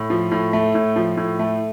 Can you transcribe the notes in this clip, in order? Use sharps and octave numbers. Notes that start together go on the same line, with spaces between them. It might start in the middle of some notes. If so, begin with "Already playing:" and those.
Already playing: A2
F3
A2
A3
A2
F3
A2
A3